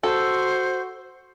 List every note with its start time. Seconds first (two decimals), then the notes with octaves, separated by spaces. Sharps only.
0.03 F#4 A4 C5